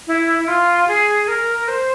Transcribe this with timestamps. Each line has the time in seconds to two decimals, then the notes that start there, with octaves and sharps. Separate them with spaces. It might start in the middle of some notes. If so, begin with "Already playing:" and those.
0.07 E4
0.39 E4
0.48 F4
0.88 G#4
1.28 A#4
1.68 C5